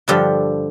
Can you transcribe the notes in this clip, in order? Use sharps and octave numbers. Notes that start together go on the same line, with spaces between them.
G2 D3 F3 G3 G4